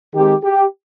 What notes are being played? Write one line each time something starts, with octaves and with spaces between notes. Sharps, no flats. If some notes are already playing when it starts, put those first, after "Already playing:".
D#3 G#3 C4 G4
G4